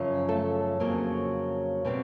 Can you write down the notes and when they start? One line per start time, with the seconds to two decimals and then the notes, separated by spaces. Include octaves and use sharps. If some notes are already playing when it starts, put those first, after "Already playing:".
Already playing: F#2 C#3 F3
0.28 A3 A4
0.80 F2 C#3 F#3 A#3
1.85 B2 G3 C4